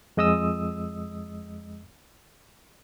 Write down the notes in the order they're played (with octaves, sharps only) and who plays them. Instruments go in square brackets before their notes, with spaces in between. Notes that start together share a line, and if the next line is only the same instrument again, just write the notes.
[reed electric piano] F2 G#3 D#5 D#6 E6